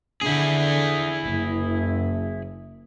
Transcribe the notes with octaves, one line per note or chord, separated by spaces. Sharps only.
D3 E4 G#4
F#1